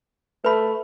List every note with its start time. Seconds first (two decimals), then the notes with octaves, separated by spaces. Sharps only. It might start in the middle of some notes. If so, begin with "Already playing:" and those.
0.45 A3 B4 B5